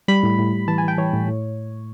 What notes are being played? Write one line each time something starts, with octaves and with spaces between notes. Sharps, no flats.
G3 B5
A2
A2
A2
E3 A5
G#5
E3 G5
E3 C#5
A2
A2